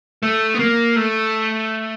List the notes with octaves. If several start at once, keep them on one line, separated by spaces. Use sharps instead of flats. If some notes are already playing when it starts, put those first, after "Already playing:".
A3
B3
A#3
A3